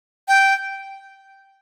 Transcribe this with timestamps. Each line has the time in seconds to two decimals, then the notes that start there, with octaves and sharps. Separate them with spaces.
0.28 G5